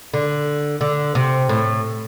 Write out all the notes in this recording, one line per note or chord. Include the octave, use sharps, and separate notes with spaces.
D3
D3
C3
A2